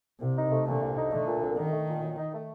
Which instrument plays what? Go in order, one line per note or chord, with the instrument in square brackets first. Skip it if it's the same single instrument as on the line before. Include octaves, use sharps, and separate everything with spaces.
[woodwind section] C2 [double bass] C3
[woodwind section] D#4
A3
[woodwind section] A#2 [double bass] D3
[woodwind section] C2
D#4
[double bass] D3 [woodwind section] A3
[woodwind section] A#2
C2
[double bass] D#3 [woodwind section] D#4
[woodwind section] A3
A#2
F#2
D#4
A3